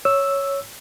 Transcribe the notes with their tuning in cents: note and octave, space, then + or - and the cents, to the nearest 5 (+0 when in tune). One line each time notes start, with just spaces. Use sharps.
C#5 +0 E6 +0